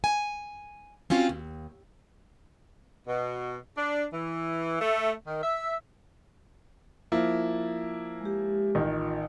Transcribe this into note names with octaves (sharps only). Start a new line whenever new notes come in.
G#5
C4 C#4 F4 F#4
D#2
B2
D4
E3
A3
D#3
E5
F3 A#3 E4
G#3 G4
A1 D#3 F4